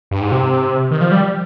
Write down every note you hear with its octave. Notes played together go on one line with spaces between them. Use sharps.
G2
G#2
C3
D#3
F3
G3